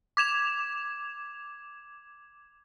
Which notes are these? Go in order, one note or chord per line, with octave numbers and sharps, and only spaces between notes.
D6 G#6 E7 F7